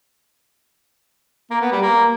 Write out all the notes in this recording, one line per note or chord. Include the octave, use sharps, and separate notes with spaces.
A#3
B3
G3
A#3